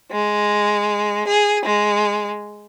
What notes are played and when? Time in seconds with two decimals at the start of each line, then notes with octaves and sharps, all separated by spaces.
0.11 G#3
1.28 G#4
1.66 G#3